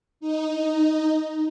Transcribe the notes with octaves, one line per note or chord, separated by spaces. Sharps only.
D#4